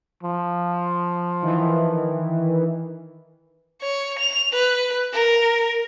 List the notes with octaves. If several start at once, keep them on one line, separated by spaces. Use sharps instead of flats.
F3
D#3 E3
C#5
F7
B4
A#4